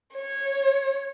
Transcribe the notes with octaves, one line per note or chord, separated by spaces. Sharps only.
C#5